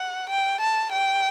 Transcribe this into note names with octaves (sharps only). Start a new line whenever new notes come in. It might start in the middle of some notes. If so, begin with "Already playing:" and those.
Already playing: F#5
G5
A5
G5